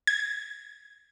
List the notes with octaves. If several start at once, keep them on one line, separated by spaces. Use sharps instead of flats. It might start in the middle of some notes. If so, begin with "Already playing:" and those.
G#6